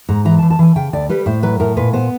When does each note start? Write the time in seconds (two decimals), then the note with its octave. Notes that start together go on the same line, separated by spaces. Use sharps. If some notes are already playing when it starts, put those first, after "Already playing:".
0.09 G#2 A#5
0.25 E3 A#5
0.39 A5
0.43 E3
0.50 A5
0.59 E3 G#5
0.76 C#3 G5
0.93 D2 D5
1.09 G3 B4
1.26 A2 C5
1.43 F#3 B4
1.60 A2 A#4
1.77 A#2 B4
1.93 B3 C5